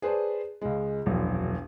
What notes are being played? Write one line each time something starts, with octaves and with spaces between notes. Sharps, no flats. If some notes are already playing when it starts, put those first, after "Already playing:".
G#4 B4 C5 D5 A5
C#2 G#3
E1 A#1 F#2